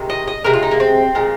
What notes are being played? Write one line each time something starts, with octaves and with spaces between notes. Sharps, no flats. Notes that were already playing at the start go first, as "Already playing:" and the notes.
Already playing: C3 D#3 G#3
D#5
D#5
C3 G#3 A#4
F4
D#4
A#3
C4
A#2 G#3